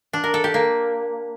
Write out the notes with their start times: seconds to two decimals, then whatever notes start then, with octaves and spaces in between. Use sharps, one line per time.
0.13 D4
0.24 A#4
0.34 A4
0.44 G4
0.54 A#3